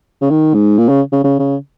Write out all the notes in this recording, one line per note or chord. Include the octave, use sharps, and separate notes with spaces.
C#3
D#3
G#2
A#2
C#3
C#3
C#3
C#3